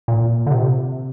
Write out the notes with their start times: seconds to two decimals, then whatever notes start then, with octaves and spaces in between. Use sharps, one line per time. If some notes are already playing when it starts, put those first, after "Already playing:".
0.08 A#2
0.46 D3
0.51 C3